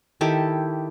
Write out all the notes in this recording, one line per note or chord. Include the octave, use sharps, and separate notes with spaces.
D#3 E4 G4 A4